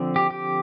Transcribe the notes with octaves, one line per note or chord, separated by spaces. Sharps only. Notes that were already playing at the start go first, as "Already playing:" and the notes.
Already playing: D3 F3 C4
G4
G4